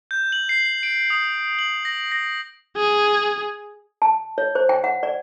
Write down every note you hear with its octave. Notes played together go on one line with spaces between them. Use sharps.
G6
F#7
C7
D7
D#6
F#7
A#6
A#6
G#4
A5
C#5
C5
G5
F#5
D5